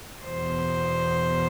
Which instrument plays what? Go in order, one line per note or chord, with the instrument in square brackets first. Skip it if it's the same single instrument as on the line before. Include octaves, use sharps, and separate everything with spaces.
[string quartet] E2 B2 C5